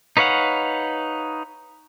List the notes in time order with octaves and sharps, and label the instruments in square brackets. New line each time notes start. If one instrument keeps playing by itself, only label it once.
[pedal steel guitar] D#4 B4 C#5 F5 F#5